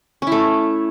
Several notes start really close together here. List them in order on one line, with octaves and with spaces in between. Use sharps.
C#4 E4 A3